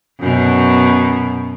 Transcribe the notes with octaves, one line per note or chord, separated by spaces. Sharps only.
F#2 B2